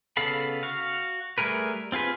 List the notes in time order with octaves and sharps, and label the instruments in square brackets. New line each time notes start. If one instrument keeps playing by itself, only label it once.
[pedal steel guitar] C#3 B3 A4 F5 B5
F#4 F5
G3 A3 G#4 A#4 B4
C4 F4 G#4 B4